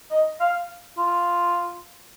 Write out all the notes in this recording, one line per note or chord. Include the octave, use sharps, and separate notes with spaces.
D#5
F5
F4